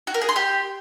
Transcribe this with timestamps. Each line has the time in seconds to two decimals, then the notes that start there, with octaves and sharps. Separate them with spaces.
0.07 F#4
0.14 A#4
0.21 G#4
0.29 C6
0.36 G4